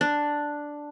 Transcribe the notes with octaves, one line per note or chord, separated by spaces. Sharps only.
D4